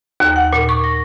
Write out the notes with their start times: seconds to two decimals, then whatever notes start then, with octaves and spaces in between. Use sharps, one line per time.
0.20 D#2
0.36 F#5
0.53 A#2
0.69 C#6
0.84 A#6